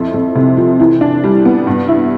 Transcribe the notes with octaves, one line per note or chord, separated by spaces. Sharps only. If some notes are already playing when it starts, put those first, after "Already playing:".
Already playing: F2 E4
F2
C3
F3
E3
D4
G3
B3
G2
E4